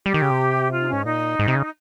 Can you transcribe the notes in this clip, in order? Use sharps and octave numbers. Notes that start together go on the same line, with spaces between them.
G3 G4
D#3
C#3
C3
F4
D#4
G#2 C#4
A#2 D#4
G#2
C3
C#3